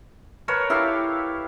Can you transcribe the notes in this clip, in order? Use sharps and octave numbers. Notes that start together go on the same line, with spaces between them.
A#4 B4 C#5 A5
E4 G4 A4 F5